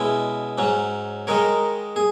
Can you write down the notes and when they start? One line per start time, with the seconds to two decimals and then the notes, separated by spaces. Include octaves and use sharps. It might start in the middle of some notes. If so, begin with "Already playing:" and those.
Already playing: B2 G#3 C#4 E4
0.58 G#2 F#3 C#4
1.27 D#3 G#3 D#4 A#4 C#5
1.96 G#4